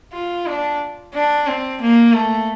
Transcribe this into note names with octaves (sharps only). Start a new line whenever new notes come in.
F4
D4
D4
C4
A#3
A3